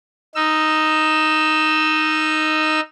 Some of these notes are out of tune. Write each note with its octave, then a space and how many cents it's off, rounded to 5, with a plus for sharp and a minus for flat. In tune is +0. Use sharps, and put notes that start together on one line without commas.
D#4 +0 E6 +20